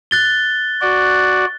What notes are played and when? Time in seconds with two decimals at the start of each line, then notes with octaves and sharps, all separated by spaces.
0.11 F#6 A6 G7
0.81 F#4 D5